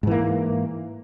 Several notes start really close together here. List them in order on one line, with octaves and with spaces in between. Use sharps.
G#2 E3 A#3